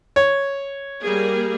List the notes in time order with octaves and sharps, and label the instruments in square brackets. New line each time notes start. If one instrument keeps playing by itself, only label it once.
[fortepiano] C#5
[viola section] G3 A#3 G#4